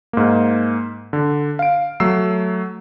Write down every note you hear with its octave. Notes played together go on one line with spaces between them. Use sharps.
G#2 A#3
D3
F5 D7
F#3 A3 E6 C7